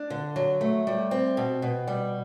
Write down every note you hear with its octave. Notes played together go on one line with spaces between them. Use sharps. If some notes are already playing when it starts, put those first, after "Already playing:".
Already playing: D4
D3
F#3
A3
G3
C4
B2
B2
G3